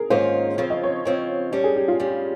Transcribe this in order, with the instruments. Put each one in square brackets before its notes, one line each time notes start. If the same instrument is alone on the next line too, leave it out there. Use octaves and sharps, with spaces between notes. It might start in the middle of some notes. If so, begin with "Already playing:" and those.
Already playing: [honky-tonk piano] G#4 A#4
[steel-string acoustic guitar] G#2 D#3 A#3 C#4 F4 [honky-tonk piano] C5
[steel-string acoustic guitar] C#3 F3 C4 F4 [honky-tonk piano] C#5
[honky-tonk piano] D#5
C#5
[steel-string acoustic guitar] C#3 F3 C4 F4 [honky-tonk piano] C#5
[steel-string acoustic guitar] G2 G3 C#4 [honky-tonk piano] G4
[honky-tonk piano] G#4
G4
F4
[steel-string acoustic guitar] G2 G3 C#4 [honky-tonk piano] G4